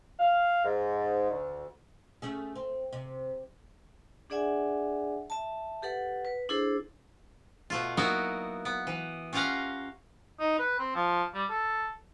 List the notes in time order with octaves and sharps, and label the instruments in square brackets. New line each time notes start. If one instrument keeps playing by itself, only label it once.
[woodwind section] F5
G#2
D2
[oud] A3 C#4 G#4
C4
C3
[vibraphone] D4 G#4 D5 E5 F#5 G#5
E5 A5
G4 A4 B4 F#5
B4
D4 E4 G#4 A4 C5
[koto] B2 A3 F4
F#3 A#3 B3 D#4 E4 F#4
B3
E3
C#4 F4 G4 F5 F#5 A#5
[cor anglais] D#4
B4
C4
F3
G3
A4